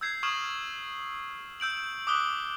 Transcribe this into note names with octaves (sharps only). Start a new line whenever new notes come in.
E6 G6 G#6 C7
C#6 D#6 F6 G#6 E7 F#7
E6 G6 D7 F#7
D6 D#6 F#6 G7